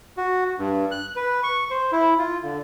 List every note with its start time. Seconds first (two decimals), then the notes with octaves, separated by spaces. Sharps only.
0.17 F#4
0.59 G2
0.91 F#6
1.16 B4
1.43 C#6
1.71 C5
1.92 E4
2.19 F4
2.43 D3